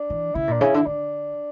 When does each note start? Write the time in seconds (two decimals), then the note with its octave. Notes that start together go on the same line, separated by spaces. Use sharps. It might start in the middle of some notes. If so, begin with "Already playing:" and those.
Already playing: D4
0.10 E3
0.35 C#3 E4
0.48 A#2 D4
0.61 C#3 E4
0.74 D3
0.86 D3 D4